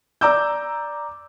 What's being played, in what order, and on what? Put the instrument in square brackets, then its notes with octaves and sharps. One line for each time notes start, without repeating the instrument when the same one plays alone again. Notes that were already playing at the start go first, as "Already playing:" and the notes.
[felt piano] D5 A#5 D6 E6 G6